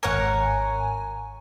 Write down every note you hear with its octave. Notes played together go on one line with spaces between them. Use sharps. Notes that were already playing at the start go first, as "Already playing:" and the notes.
G#1 A#4 C#5 F#5 G#5